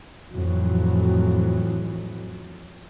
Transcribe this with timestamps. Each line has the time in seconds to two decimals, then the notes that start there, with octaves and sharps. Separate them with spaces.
0.31 F2 A2 E3 F#3